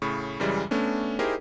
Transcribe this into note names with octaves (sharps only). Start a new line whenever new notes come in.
A2 C#3 B5 C#6
F#2 C#3 E3 G3 G#3
A3 B3 C#4 D4
D#4 E4 G4 G#4 A#4 C5